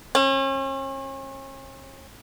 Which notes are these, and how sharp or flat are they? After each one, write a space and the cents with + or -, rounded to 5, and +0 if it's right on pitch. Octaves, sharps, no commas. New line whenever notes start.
C#4 -40